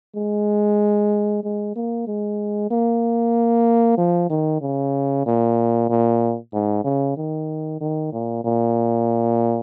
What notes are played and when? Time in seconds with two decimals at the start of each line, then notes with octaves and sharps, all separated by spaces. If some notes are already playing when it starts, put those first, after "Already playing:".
0.16 G#3
1.44 G#3
1.76 A#3
2.07 G#3
2.71 A#3
3.98 F3
4.30 D#3
4.61 C#3
5.26 A#2
5.90 A#2
6.53 G#2
6.84 C#3
7.17 D#3
7.81 D#3
8.13 A#2
8.44 A#2